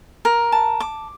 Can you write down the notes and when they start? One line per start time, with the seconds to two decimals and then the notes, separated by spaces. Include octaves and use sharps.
0.25 A#4
0.52 A5
0.80 D6